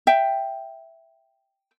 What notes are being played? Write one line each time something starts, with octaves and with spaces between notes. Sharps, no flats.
E5 G5